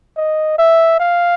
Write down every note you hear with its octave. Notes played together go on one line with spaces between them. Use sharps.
D#5
E5
F5